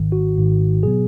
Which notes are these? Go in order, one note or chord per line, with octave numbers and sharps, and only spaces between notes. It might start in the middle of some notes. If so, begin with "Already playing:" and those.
Already playing: G#1 G#2 D#3
F#4
G#1 G#2 D#3
B2 F#3 B3 G#4